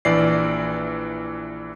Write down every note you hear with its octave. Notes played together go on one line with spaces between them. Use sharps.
A#1 E3 D5 C7